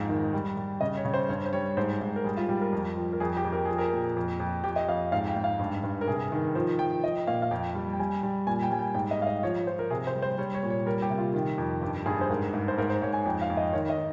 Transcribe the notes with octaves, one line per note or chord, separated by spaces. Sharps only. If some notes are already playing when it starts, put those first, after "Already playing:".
Already playing: F2 G#2 F5
D#3
G3
G3
C#3 D#5
C#5
C#3
C5
G2 C#5
C5
G3 C#5
G#2 C5
G#2
A#4
G3 G#4
F4
G3 G4
A#4
F2
F3
A#4
F2 G#4
G4
F2
A#4
F3 G#4
A#4
A#2
F2
F2
F2 G4
D#5
F2 F5
G#2 F5
G5
G#2
F5
G2
G2
A#4
C3 G#4
D#3
F3 C5
F3 G5
F3 D#5
A#2 F5
F5
F2 G5
G3
G5
G3 G#5
G3
A#2 G#5
G5
G3 G#5
G5
G#2 G5
D#5
G#2 F5
D#5
F3 C#5
F3 C5
A#4
C3 G#4
C5
G3
C5
G3 C#5
C#5
A#2
C#5
G3 A#4
G4
C3
F4
D#3
F2
G2 G4
G2 G#4
C5
G#2 A#4
G#2
C5
G#2 A#4
C5
G#2 C#5
G#5
F2 G5
F5
F2
D#5
D#3 C#5
D#5
D#3